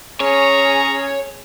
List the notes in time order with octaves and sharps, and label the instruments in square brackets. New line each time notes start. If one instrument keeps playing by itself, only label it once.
[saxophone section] C#4 [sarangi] G#4 [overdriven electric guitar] C#5 [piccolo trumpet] A#5